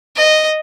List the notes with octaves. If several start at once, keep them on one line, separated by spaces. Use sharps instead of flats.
D#5